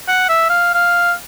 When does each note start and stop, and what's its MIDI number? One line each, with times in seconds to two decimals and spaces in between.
0.08 0.28 78
0.29 0.45 76
0.50 0.69 77
0.74 1.12 77